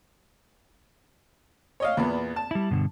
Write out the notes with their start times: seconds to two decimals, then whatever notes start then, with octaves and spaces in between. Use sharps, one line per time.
1.80 C#5 D#5 F5
1.97 E2 A#2 B3
2.36 A5
2.51 G3 E4
2.71 G2 B2 D3